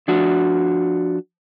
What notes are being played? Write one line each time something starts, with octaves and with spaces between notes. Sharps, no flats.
F3 D4 F#4